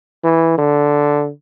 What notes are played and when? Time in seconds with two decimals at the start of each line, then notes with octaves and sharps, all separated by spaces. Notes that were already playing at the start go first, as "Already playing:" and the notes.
0.24 E3
0.58 D3